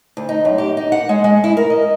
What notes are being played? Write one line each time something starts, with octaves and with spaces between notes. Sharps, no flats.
D2
D#4
F#2
G4
D#4
F#5
G#3
G#3
E4
A#4
D#5